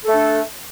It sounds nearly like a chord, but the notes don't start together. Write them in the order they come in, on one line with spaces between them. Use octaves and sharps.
A4 A3 D4